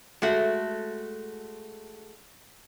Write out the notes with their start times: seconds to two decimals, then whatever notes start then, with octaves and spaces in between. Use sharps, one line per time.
0.22 G#3 A3 F#4